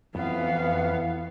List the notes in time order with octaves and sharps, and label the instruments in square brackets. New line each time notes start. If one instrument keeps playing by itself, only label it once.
[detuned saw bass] F2 [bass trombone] E3 [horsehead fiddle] B3 F5